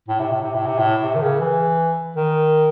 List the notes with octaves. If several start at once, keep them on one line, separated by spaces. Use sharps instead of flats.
A2
C3
A2
C3
A2
C3
A2
C3
D#3
C#3
E3
D#3